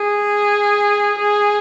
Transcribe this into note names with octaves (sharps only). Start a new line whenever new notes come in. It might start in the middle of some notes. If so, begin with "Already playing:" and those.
Already playing: G#4
G#4